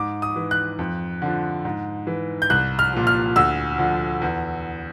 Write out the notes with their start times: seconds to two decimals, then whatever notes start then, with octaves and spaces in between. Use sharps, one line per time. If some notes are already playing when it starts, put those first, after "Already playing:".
Already playing: G#2 D6
0.22 D#6
0.36 E3
0.51 F#6
0.79 F2
1.22 D3 F3
1.65 G#2
2.07 E3
2.42 G6
2.50 C2 F#6
2.79 F6
2.93 A#2 F3
3.07 F6
3.36 D2 E6
3.78 D3 F3
4.22 E2